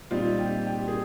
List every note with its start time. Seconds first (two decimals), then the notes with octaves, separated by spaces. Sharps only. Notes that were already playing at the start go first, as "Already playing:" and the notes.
0.11 A#2 G3 C4 D#4 F4
0.39 G4
0.67 G4
0.88 G#4